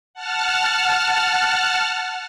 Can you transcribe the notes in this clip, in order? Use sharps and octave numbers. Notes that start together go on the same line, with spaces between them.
F#5 A5 F6